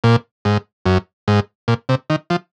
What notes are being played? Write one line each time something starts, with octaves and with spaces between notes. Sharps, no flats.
A#2
G#2
F#2
G#2
A#2
C3
D#3
F3